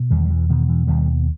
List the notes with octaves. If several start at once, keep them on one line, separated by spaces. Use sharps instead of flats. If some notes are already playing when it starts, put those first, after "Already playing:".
Already playing: B2
E2 D#3 G3
G3
E3
B2 D#3
E3
D#2 D#3 G3